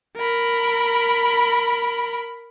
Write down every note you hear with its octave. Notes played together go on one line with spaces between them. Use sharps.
A#4 B5